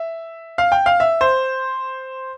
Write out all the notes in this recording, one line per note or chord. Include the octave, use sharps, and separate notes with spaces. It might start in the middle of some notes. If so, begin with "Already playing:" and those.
Already playing: E5
F5
G5
F5
E5
C5